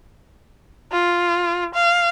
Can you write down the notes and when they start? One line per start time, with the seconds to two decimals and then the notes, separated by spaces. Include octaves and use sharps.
0.92 F4
1.75 F5